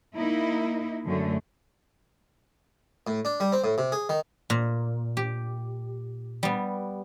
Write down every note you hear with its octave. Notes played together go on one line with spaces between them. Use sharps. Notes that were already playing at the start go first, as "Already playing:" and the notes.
A#3 D#4 E4
F#2 D3 A3
A2
D4
G3
C4
A2
C3
G#4
D#3
A#2
G4
G3 B3